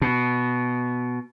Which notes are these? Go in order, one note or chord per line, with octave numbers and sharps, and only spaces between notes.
B2